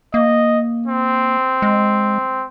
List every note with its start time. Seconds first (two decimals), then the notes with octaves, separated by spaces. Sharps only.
0.14 A#3 D#5
0.88 C4
1.62 G#3